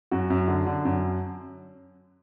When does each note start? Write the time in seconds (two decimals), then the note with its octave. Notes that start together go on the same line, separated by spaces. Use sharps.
0.11 F#2 F#4
0.30 F#2
0.48 D3
0.67 D3
0.85 F#2